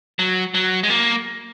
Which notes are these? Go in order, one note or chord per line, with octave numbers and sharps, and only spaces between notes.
F#3
F#3
G#3
A#3